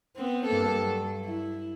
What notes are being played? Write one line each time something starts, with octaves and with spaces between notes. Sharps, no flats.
B3 C4
G2 A#3 A4
F#3
E4